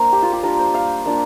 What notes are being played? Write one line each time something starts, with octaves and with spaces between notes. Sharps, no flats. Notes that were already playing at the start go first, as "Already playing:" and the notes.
Already playing: A#3 D4 A#4 C5 A#5
G4
F4
G4
G3 D4 F4 A#4
C5
F5
A#3 D4 F4